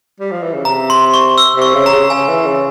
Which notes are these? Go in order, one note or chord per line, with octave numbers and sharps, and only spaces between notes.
G3
F3
E3
C#3
C3 A#5
C6
C#6
E6
C3
C#6
C#3
A#5
C#3
C#3 G#5
E3
C#3